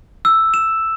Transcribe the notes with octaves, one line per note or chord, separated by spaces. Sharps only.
E6
E7